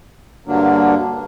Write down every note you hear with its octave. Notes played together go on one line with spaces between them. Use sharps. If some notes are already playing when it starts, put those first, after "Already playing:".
G2 D3 F#3 A#3 D4